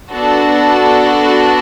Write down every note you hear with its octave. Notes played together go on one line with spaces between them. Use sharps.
B3 D4 F#4 A4